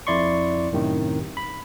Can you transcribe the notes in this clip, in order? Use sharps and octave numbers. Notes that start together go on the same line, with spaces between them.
F2 E4 D5 C6 C#6
F#2 A2 C3 D#3
B5